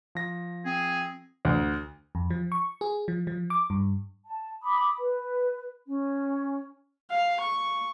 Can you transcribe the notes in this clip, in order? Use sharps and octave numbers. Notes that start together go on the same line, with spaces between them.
F3 A#6
C4 G#4
D2
F2
F3
C#6
G#4
F3
F3
D6
G2
A5
B5 D6 D#6
B4
C#4
F5
C#6